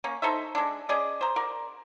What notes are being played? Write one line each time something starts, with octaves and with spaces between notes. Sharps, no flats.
A#3 C#4
D#4 A4 C5 E5
G#3 D4
C#4 G#4 D5 D#5
C5 A#5
A#4 D5